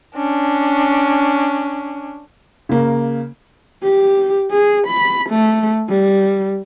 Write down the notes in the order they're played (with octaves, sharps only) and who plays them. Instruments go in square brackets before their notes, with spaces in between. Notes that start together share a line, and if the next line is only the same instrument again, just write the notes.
[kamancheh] C#4 D4
[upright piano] C#3 A#3
[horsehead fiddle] G4
G#4
B5
A3
G3